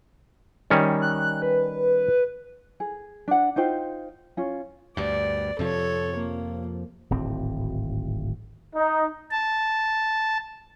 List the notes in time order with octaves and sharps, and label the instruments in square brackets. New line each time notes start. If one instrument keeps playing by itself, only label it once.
[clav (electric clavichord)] D#3 G3 C#4
[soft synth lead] F#6
B4
[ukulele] G#4
D4 F#5
D#4 F4 C5 G5
C#4 F4
[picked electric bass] D2 G2 [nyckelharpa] D5
[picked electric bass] F2 C3 F3 [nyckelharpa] A4 C#5
[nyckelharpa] A#3
[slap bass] D1 G#1 C4
[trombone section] D#4
[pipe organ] A5